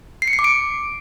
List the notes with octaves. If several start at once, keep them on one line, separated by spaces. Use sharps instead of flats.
C7
C#7
C7
D6
D7